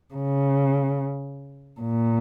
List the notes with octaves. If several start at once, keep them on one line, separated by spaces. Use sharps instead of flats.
C#3
A#2